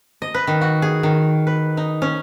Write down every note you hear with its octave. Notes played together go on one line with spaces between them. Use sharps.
D#5
B4
D#3
F#4
G#4
D#3
B4
D#4
C#4